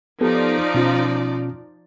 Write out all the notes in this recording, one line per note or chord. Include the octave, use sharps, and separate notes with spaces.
F3 B3 D#4 G4 A4 D5
B2 C#4 F4